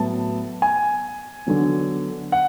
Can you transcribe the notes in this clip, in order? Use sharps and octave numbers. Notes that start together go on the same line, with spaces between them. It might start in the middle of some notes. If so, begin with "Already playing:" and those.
Already playing: A2 F#3 B3 A5
G#5
D3 F#3 B3
F#5